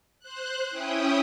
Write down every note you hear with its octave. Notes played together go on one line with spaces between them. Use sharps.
C5 F#6
C#4 E4 G5 D#6